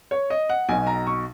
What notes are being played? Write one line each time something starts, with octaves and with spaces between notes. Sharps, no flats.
C#5
D#5
F#5
B1 B2 G#5
A#5
C#6